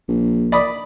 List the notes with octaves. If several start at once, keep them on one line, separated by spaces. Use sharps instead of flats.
A#1
D5 B5 D#6